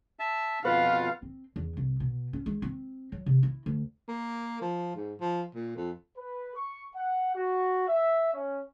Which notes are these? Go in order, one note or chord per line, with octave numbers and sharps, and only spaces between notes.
E5 A5
F2 B2 F4 B4 F5 F#5
C4
E2
C2
B2
C#4
G#3
C4
F#3
C3
E4
D2
A#3
F3
G#2
F3
A#2
F2
B4
C#6
F#5
F#4
E5
C#4